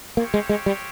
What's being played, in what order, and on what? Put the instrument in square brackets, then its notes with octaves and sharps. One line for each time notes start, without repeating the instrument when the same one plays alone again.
[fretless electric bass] A#3 [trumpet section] C4 G4 C#5 F5
[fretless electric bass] G#3
G#3
G3